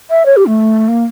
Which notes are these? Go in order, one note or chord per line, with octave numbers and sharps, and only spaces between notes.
E5
C#5
G4
A3
A#3